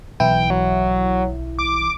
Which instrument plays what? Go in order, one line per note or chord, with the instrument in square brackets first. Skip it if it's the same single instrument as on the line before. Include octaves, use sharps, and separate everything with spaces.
[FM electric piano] B1 E3 E4 [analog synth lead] G5
[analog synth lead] F#3
D6